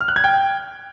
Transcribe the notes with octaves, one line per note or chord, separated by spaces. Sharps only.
F6
F#6
G#6
G5